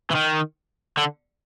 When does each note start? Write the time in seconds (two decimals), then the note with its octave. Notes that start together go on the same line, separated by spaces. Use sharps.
0.11 E3
0.15 D#3
0.97 D3